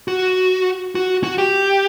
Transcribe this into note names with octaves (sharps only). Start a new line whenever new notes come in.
F#4
F#4
F#4
G4